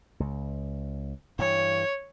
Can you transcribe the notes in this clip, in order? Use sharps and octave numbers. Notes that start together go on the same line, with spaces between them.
C#2
G2 E3 C#5